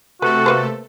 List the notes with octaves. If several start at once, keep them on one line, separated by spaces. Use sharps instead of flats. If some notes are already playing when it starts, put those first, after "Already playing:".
C3 A3 F#4 A4 B4
A#3 B4 C5